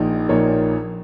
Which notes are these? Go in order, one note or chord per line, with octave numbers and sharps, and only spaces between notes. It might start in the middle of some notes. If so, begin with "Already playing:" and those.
Already playing: A#1 A#2 D#4
A#1 A#2 A#3 D#4 C#5